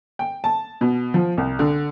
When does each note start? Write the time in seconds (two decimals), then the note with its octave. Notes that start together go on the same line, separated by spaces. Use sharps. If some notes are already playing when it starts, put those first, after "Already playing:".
0.19 G5
0.44 A5
0.81 B2
1.14 F3
1.37 C2
1.59 D3